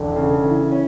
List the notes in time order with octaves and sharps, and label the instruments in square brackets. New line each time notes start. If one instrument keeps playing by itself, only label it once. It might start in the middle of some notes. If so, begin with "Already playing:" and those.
Already playing: [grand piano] E1 [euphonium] D3
[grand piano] C#3
E3
C#4